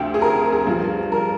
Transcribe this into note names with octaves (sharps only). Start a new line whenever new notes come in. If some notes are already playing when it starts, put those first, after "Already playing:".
Already playing: D2 C3 F3 G5
G#4
A#4
G#4
G2 F3
A#4